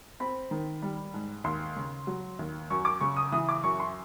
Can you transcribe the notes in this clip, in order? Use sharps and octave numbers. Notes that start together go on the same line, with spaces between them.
C4 B5
D#3
G3
G#2
D#2 C6
C#3
F#3
D#2
F#2 C#6
D6
C#3 C#6
D#6
E3 D#6
D6
F#2 C#6
C6